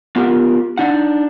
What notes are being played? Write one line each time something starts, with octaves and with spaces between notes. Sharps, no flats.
B3 F4 G4 A#4
D4 D#4 F#5